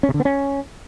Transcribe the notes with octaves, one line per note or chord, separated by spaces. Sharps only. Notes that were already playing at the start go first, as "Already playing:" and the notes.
C#4
C3
D3
B3
C#4